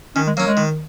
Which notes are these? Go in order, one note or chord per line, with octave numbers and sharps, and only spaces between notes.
D#3 C#4
G#3
F#3 A#3 C#4
G#3
D#3